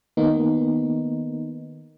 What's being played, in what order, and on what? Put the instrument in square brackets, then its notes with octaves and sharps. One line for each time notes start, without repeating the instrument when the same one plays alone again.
[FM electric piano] D#3 A#3 B3 D#4